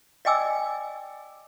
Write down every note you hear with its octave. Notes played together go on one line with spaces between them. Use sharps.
D5 D#5 G5 G#5 D6 E6